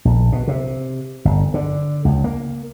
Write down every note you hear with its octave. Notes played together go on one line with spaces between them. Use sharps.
A#1
B2
C3
G1
D3
C#2
A#3